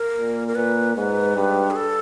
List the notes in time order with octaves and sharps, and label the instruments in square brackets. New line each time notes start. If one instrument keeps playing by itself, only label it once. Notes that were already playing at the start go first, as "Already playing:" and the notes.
Already playing: [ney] A#4
[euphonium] A#2
[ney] A#4
[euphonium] A#2 [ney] B4
[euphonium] G#2 [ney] B4
[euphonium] G2
[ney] G#4
A4